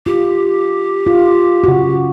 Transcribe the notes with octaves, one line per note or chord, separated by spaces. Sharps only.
F4 G4
F4
C#3 F#4